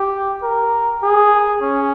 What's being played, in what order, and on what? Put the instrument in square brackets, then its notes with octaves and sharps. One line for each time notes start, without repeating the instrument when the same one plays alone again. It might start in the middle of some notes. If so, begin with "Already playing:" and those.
Already playing: [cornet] G4
A#4
G#4
C#4